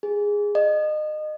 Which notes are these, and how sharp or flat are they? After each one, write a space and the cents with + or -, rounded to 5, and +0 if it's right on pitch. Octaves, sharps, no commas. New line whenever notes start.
G#4 -10
D#5 -30